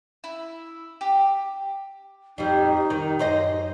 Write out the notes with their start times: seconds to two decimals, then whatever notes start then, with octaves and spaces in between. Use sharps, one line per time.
0.24 E4
1.01 G4
2.38 F2 G3 D#4
2.90 D#3
3.19 F#2 C5 D#5